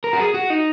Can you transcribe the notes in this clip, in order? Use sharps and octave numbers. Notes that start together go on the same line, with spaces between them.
A#4
F#4
G#4
F#4
D#4